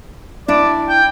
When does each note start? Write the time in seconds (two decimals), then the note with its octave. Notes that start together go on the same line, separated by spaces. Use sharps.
0.48 D4 E4 D5
0.89 G5